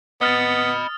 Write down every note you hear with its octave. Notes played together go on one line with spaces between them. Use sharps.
B3 D#5 B5 D#6 F6 A6